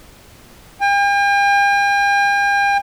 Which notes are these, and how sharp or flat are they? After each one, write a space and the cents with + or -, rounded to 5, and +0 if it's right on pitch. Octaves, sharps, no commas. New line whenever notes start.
G5 +45